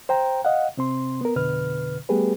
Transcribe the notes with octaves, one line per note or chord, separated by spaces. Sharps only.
C5 G5 A#5
D#5 F5 F#5
C3 C4 C6
B3 A#4
F2 B2 D3 B4 F6
G3 A3 B3 G4 G#4 B4